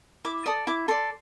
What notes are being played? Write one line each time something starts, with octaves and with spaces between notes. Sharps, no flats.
E4 D6
A4 D5 D#6
E4 D6
A4 D5 C6